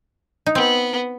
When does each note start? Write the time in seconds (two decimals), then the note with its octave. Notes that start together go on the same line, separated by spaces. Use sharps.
0.46 D#4
0.55 B3 C4